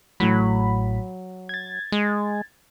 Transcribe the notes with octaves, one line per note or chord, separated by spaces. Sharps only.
A1 A2 F#3 B5
G#6 A6
G#3